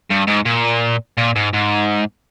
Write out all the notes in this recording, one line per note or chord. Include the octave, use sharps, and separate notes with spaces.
G2
G#2
A#2
A#2
G#2
G#2